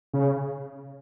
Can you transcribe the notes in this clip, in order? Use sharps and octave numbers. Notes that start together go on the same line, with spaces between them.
C#3